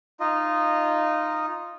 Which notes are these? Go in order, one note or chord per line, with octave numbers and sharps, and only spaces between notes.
D#4 F4 D#5